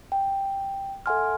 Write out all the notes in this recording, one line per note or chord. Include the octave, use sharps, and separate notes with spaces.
G5
A4 E5 F#5 G#5 C6 F6